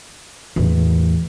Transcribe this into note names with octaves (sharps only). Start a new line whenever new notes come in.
E2 A2